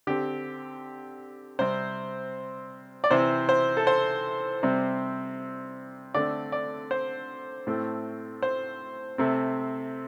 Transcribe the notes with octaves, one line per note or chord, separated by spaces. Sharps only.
D3 C4 G4
C3 G3 C4 C5
D5
C3 E3 C4 C5
C5
A4
C5
C3 G3 C4
D3 A3 C4 D5
D5
C5
A2 A3 C4
C5
C3 A3 C4